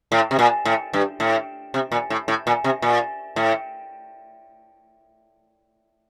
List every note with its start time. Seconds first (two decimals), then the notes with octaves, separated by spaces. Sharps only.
0.12 A2
0.31 C3
0.39 A#2
0.65 A2
0.93 G2
1.20 A2
1.74 C3
1.92 A#2
2.10 A2
2.28 A2
2.47 A#2
2.64 C3
2.82 A#2
3.36 A2